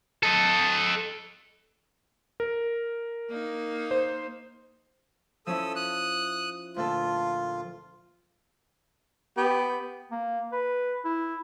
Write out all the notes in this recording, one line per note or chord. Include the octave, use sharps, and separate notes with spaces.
A4 D#5
A#4
A#3 D#4
C5
F3 C#4 E4 A4 D#6 E6
D#6 F#6
D2 A#2 F4 A4
B3 G4
A#3
B4
E4